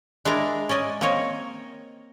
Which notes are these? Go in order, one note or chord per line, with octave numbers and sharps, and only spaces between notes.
G#3 D4 E4 A#4
C#4 D5 D#5 G#5
A#3 C4 A#4 C#5 D#5